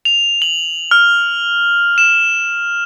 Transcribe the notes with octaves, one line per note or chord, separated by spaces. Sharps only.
F7
F#7
F6
E7